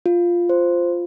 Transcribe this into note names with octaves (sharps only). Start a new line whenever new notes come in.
F4
C5